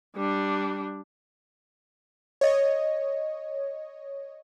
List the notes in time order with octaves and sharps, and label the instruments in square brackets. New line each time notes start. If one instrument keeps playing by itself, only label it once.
[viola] G3 D4
[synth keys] C#5 D#5